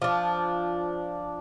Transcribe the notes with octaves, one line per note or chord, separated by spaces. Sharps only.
F3 D4